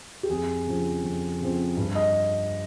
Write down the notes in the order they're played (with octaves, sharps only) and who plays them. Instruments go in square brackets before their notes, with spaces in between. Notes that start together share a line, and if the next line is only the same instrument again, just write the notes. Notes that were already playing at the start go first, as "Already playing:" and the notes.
[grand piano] G4
F2 G#4
C#3 F3 C4
F2
C#3 F3 C4
G2
D#5